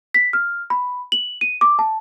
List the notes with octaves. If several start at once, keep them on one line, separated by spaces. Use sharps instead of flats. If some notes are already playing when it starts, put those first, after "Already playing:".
B6
F6
B5
F#7
D#7
D6
A5